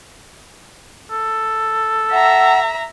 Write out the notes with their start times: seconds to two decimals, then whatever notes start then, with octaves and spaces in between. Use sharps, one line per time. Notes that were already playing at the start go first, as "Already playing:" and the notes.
1.10 A4
2.12 E5 F#5 A#5